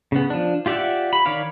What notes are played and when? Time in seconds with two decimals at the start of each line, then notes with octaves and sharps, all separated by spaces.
0.12 C#3 B3
0.30 F3 D4
0.66 F4 G4 D5 E5 F#5
1.13 B5
1.25 D#3 C#5 D5 F5 B5